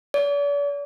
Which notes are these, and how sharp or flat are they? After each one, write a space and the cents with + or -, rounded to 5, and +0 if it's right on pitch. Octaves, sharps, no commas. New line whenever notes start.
D5 -45